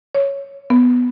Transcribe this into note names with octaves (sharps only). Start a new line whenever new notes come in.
C#5
B3